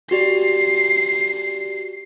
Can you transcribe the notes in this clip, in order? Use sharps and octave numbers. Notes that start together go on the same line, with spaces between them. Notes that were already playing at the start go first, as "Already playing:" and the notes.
F#4 G4 D5 C7